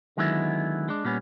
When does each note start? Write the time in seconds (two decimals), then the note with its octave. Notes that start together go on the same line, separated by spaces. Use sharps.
0.17 D3 D#3 F#3 G#3 B3 E4
0.89 G#3 D4
1.05 A#2 G3 B3 C#4